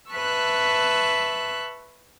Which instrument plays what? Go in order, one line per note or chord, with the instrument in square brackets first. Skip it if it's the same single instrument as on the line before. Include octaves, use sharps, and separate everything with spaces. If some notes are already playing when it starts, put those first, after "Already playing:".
[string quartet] B4 E5 A5 C#6 E6 F#6